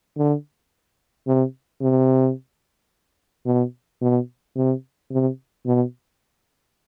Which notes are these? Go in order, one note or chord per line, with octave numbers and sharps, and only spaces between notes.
D3
C3
C3
B2
B2
C3
C3
B2